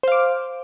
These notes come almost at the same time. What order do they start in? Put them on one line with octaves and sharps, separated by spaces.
C5 F5 D6